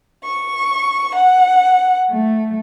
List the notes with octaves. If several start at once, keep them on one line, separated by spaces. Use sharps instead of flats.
C#6
F#5
A3